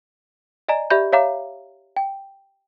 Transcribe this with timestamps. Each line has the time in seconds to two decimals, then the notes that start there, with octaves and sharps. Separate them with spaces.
0.69 D5 D#5 G#5 A#5
0.90 G4 D5 E5 B5 G6
1.13 C#5 E5 F5 A#5 D6
1.97 G5